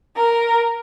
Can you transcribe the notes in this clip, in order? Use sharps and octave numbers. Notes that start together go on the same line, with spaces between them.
A#4